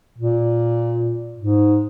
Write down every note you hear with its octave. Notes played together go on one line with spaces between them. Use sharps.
A#2
G#2